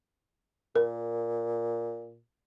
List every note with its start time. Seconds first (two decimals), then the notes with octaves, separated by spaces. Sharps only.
0.76 A#2 A#4